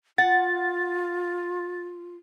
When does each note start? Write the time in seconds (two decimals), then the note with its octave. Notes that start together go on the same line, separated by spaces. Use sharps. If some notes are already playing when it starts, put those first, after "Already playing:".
0.18 F4 F#5 A6